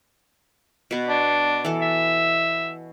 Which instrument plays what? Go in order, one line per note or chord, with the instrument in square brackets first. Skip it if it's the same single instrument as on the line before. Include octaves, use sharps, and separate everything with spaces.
[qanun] B2 B3
[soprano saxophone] D4
[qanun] E3 A4
[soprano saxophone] E5